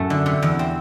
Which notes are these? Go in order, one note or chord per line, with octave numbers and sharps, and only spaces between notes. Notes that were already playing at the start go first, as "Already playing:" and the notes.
Already playing: F#2 A2 A3
D3
C3
E2
C4